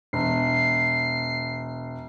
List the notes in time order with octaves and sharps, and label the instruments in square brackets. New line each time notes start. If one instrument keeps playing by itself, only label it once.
[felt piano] E1 [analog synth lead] C7